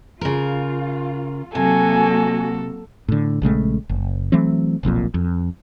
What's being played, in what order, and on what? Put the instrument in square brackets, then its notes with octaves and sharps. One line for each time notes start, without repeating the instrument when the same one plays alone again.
[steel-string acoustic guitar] C#3 A#4 [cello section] F4
[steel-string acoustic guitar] C3 [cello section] F#3 A#3 F#4 [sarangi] A4 [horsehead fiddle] G#5
[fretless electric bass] A2 D3
A#1 C#3 G#3 A3
F#1
E3 F#3 A3 C4
F1 B1 F2 A#2
F2